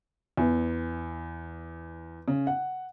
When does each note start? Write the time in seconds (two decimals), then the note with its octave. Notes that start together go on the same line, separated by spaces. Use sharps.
0.37 E2
2.28 C#3
2.47 F#5